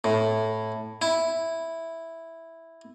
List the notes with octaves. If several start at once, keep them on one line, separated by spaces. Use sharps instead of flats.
A2
E4